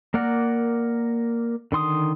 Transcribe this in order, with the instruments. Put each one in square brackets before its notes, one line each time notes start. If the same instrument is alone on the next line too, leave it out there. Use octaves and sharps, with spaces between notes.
[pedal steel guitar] A#3 A#4 D5 F#5
D3 D#3 C6 D#6